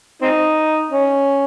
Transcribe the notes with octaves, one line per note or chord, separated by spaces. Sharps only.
C4 D#4
C#4